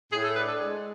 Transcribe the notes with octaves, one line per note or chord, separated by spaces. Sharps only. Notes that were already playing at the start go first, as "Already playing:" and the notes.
A2 G#4
A4
D4 B4
A4
G#3 G#4